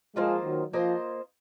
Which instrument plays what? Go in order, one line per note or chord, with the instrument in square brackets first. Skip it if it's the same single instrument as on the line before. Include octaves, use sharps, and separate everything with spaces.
[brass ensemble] F3 G#3 [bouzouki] A#3 F4 C5 D#5
[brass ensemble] D#3 F#3
[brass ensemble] F3 [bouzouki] A#3 F4 C5 D#5